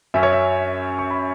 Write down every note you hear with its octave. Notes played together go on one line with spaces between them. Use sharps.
F#2 F#3 C#4 E5
C#5
E5
C#6
B5